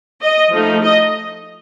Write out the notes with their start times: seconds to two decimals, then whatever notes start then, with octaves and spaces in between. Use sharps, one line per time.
0.22 D#5
0.52 F3 A3 D#4
0.83 D#5